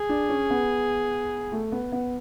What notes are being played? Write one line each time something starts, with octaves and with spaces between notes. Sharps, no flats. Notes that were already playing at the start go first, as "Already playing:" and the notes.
Already playing: G#4
D4
C#4
B3
A3
B3
B3